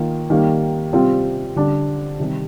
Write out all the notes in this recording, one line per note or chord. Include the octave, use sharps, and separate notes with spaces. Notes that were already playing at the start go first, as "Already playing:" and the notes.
Already playing: D#3 A#3 F4
D#3 G3 A#3
C3 G3 C4 F4
D3 G3 D4
C3 D#3 G3